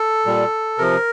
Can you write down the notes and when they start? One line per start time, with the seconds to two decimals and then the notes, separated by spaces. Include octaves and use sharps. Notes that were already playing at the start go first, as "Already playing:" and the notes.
Already playing: A4
0.26 A#2 G3
0.78 C3 F3 A#4